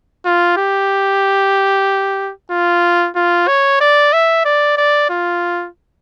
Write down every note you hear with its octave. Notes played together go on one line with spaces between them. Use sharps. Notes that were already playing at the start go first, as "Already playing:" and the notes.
F4
G4
F4
F4
C#5
D5
E5
D5
D5
F4